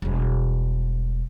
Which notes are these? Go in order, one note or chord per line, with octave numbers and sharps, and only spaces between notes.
E1 G3